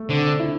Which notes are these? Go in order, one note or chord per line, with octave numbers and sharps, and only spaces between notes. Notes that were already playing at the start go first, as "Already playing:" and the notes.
Already playing: A3
D3 C4
D4
E4